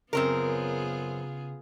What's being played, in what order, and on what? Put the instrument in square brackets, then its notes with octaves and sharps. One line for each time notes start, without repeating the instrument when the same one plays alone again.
[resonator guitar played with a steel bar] F#2 C4 A#4 [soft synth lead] C#3 [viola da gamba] B3 F4 G#4